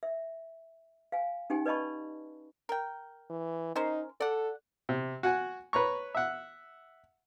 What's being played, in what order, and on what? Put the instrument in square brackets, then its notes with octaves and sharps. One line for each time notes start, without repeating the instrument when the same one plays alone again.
[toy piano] E5
F5 G#5
C#4 D#4 G4 G5 G#5
B4 D5 D#5 A5 B5 C#6
[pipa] A#4 G5
[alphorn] E3
[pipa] C#4 A#4 C5 [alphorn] D#4
[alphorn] A4 [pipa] D5 F#5
[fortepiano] C3
F#4 F#5 G#5
B4 C#5 A#5 C#6
E5 F#5